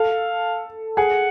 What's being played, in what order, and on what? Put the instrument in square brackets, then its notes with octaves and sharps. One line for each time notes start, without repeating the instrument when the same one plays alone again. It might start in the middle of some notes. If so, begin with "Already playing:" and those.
Already playing: [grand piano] A4 [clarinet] F5
[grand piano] G#4 [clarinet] F#5